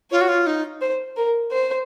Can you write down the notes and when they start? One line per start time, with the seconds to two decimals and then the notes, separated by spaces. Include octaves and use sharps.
0.11 F4 C#5
0.21 F#4
0.28 F4
0.47 D#4
0.82 C5
1.17 A#4
1.52 C5